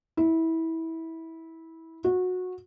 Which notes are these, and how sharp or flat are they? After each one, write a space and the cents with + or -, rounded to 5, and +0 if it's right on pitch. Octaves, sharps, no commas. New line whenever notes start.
E4 -20
F#4 -20